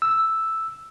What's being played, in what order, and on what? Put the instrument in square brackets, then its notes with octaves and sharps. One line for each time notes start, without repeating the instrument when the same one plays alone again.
[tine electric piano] E6